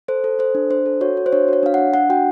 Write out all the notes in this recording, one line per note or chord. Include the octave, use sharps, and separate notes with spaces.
A4 C5
A4
A4 C5
D4
D4 C5
A4
F#4 C#5
F#4
C5
D4 C#5
F#4 C#5
D4 F5
D4 F#5
D4 F#5
F#4 G5